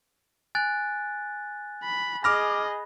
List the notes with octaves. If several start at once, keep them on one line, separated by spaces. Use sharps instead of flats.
G#5 F#6 A6
B5
G#4 D#5 B5 D6 F6 A#6